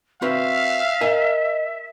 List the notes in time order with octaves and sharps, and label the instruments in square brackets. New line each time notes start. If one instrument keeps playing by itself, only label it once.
[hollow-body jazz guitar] C4 F#4 B4 [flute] E5 [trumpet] F5
[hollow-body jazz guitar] A#4 G#5 [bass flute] D#5